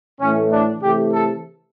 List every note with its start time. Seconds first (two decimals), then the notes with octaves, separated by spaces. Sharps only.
0.20 A2 E3 A3 C#4
0.51 D4
0.81 C3 E3 A3 G4
1.12 A4